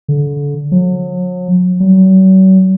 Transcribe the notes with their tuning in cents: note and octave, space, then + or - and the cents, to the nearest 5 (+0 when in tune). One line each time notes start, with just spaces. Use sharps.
D3 -30
F#3 -40
F#3 +40